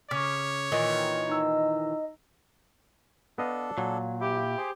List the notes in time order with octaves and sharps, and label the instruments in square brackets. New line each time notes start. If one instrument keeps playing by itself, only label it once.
[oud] C#3 [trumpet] C#5 [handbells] D6 F6 B6
[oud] A#2 D#3 E3 [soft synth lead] D#5
[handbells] D#4 E6
[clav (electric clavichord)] B3 D#5 F5 [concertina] D4 A4
[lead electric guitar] A#2 [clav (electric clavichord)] F#3
[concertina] E4 [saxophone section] G4
[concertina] G#4 C5